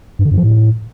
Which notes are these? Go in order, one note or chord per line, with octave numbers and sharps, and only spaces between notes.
G2
D3
F#2
F3
A2